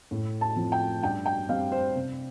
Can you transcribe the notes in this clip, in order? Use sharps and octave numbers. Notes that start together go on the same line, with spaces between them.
A2
A5
F3 C4
G5
G2 G5
G5
G3 C4 F5
C5
C3